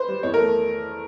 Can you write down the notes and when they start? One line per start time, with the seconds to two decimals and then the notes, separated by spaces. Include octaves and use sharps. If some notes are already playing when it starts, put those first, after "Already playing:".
Already playing: B4 C5
0.08 G3
0.23 E2 C#5
0.34 A#4
0.39 A3